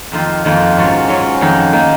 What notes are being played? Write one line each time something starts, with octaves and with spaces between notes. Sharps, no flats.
F2 D#3 A#3 F4
F2 D#3 A#3 F4
G#2 F#3 C#4 F4
G#2 F#3 C#4 F4
F2 D#3 A#3 D#4
D#3 A#3 D#4